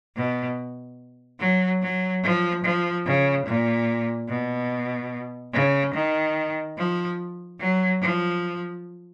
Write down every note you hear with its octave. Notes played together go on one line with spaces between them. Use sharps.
B2
F#3
F#3
F3
F3
C#3
A#2
B2
C#3
D#3
F3
F#3
F3